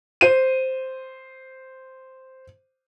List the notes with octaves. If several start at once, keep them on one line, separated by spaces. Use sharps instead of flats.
C5 D#7